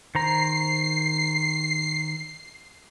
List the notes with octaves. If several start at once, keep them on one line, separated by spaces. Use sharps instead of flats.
D#3 C5 A#5 C7